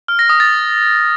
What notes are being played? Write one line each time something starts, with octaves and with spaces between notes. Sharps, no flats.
F6
A#6
D#6
A6